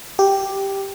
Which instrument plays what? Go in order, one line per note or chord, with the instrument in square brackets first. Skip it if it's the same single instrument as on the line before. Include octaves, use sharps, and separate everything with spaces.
[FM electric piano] G4